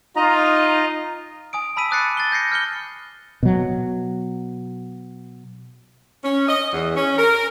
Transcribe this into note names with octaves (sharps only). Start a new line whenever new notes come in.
D#4 F4 D#5 A#5
G#5 D#6 D7
A5 B5 E6 B6 D#7
D6 D#6 F#6 A6 C7 C#7
A6 C7 G7
G6 A#6 C7 C#7
F6 G6 C#7 G7
B2 F#3
C#4
D#5
E2
C#4
A#4